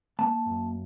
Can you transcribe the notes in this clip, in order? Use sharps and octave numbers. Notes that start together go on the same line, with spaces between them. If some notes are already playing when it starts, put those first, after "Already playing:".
A#3 A5
F#2